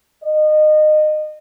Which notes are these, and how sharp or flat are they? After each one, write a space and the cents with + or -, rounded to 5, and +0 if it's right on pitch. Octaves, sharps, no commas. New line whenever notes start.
D#5 -25